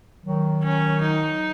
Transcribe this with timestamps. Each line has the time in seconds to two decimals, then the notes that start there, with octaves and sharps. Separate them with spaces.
0.24 D#3 F#3
0.64 C#4
1.02 D#4